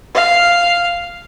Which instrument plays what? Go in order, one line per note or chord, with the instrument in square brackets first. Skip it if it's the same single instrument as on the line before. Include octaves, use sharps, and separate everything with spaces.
[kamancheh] F5